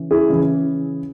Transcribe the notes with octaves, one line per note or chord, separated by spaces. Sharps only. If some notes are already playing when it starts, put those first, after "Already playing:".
Already playing: C#3 E3
E4 G#4
C#3 E3